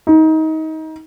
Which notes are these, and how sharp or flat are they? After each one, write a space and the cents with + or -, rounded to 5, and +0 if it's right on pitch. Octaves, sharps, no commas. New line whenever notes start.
D#4 +25